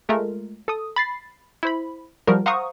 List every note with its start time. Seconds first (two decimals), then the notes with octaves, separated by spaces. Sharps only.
0.09 G#3 A3 F4 A#4
0.68 A4 D#6
0.96 B5 A6 C7
1.63 E4 C5 B5
2.27 F3 G3 F#4 A#4
2.46 C5 F5 F#5 A#5 C#6 D#6